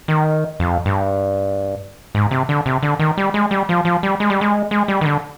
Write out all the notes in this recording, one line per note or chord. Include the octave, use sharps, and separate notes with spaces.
D#3
F2
G2
G#2
C3
D3
C3
D3
D#3
G3
G#3
G3
F3
F3
G3
G#3
G3
G#3
G#3
G3
D#3
D3